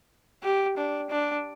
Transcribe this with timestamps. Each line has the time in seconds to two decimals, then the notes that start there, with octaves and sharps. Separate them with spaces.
0.43 G4
0.77 D4
1.10 D4